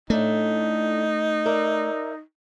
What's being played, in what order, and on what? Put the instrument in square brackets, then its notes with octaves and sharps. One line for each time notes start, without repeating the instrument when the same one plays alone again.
[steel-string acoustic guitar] A2 D4 [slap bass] A3 [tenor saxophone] D#4
[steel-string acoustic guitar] A#4 D5 E5